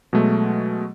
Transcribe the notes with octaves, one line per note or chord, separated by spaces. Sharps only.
B2 F#3 G#3 A3